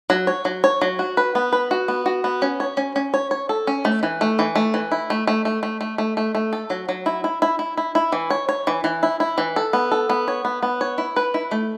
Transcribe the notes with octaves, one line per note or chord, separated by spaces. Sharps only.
F#3
C#5
F#3
C#5
F#3
F#4
B4
B3
B4
F#4
B3
F#4
B3
C#4
C#5
C#4
C#4
C#5
C#5
A4
C#4
A3
E3
A3
E3
A3
E3
E4
A3
A3
A3
A3
A3
A3
A3
A3
A4
F#3
F#3
E4
E4
E4
E4
E4
E4
E3
C#5
C#5
E3
E3
E4
E4
E3
A4
B3
A4
B3
C#5
B3
B3
C#5
E4
B4
E4
A3